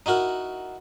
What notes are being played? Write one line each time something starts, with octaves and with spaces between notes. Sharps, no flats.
D#4 E4 F#4 A#4